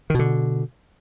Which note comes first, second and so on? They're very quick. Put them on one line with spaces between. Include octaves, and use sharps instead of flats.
D#3 B2 D3